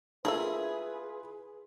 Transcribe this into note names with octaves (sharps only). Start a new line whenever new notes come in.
A3 A#3 E4 F4 G#4 B4 E5